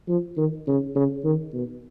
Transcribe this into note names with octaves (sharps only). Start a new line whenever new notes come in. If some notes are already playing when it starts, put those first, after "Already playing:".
F3
D#3
C#3
C#3
D#3
B2